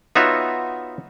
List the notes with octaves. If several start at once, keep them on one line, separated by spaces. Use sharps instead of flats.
B3 D#4 F4 F#4 C#5 E5